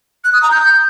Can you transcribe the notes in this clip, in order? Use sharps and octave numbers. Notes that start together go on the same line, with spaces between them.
F#6
D#6
A#5
G6